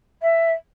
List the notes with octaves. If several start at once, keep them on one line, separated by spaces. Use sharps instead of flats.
E5